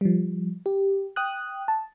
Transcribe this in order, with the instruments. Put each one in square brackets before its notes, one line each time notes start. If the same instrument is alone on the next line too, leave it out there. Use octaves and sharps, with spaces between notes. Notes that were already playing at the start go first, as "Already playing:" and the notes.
[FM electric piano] F3 G3
G4
G5 D#6 F#6
A5